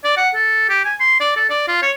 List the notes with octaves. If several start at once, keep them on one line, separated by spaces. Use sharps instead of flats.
D5
F#5
A4
G4
G#5
C6
D5
A4
D5
F4
C#5